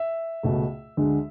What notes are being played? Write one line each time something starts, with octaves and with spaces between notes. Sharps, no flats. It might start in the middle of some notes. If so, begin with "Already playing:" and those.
Already playing: E5
C#2 B2 A3
D2 D3 G#3